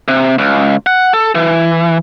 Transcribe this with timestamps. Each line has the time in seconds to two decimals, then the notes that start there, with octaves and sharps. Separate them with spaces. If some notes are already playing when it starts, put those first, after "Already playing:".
0.08 C3
0.39 C#2
0.87 F#5
1.14 A4
1.35 E3